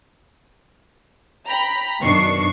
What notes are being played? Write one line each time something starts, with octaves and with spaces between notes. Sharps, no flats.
G5 A#5 B5
F#2 B2 D#3 D4 C#6 C7